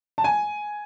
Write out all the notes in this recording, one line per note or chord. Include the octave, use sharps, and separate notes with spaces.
A5
G#5